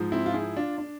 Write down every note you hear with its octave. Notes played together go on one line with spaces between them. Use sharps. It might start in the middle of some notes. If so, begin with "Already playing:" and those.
Already playing: G#2 F3
C4 E4
F4
E4 G#4
D4 F4
D4